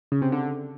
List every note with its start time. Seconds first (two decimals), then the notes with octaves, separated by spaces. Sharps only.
0.12 C#3
0.22 C3
0.32 D3